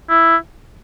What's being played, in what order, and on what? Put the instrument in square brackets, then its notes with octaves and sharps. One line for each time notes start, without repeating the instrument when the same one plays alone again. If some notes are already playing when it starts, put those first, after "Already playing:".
[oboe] E4